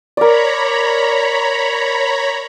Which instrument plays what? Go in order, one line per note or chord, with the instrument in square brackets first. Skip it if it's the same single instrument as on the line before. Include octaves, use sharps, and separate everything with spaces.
[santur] A#4 D5 [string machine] C#5 A#5 B5